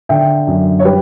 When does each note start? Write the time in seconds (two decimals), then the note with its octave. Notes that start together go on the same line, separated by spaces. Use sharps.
0.09 D3 E5 G5
0.47 F#2
0.79 C#5
0.85 G3 G4 B4